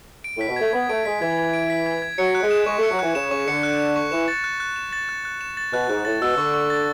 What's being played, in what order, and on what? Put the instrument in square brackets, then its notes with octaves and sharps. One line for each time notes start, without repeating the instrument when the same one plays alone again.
[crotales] D7
[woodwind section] A2 [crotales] B6
[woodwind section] B2
[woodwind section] A3 [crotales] G#6
[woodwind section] B3 [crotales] G#6
[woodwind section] A3 [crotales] D7
[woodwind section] G#3 [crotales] B6
[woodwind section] E3 [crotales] G#6
[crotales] G#6
D7
B6
G#6
G#6
[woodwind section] F#3 [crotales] C#7
[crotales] F#6
[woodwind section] G#3
[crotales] E7
[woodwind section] G#3 [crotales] C#6
[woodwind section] A3 [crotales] C#7
[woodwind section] F#3
[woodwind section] E3 [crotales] F#6
[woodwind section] C#3 [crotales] E7
[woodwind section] C#3 [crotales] C#6
[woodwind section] D3 [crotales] C#7
[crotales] F#6
E7
C#6
[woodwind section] E3 [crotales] E7
[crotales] A6
F#6
F#6
E7
A6
F#6
F#6
E7
A6
[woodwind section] B2 [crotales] F#6
[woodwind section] G#2 [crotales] F#6
[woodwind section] A2 [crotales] A6
[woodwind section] B2 [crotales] E6
[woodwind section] D3 [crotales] C#6
[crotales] C#6
A6